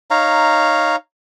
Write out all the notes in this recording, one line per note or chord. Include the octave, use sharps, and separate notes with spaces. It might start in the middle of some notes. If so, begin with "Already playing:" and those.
D#4 C#5 F5 A#5